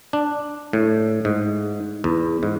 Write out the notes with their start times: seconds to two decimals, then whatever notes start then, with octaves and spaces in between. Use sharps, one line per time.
0.13 D4
0.73 A2
1.25 G#2
2.04 E2
2.43 G#2